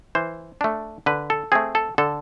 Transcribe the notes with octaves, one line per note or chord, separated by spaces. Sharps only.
E3 C5
A3 D4
D3 B4
A4
A3 C4 G#4
A4
D3 A4